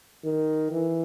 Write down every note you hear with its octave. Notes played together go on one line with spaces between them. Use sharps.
D#3
E3